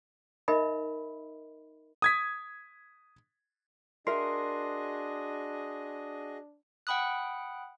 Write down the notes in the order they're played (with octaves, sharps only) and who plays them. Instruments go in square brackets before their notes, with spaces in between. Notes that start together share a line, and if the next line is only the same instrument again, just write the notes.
[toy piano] D#4 A#4 D#5 E5 B5
[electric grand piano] D#6 G#6 B6
[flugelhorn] D4 [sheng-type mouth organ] F#4 G#4 D#5 [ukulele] A#4 E5 [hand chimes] C6 C7
[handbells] F#5 G5 B5 D#6 F#6